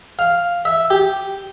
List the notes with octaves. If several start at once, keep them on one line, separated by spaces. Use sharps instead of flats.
F5
E5
G4